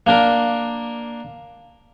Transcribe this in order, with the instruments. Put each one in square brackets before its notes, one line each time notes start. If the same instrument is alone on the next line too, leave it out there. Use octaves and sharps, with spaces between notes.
[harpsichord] A#3 D4 A#4